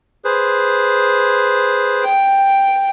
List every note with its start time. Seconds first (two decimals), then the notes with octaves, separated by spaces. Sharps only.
0.25 G#4 B4 C5
2.04 G5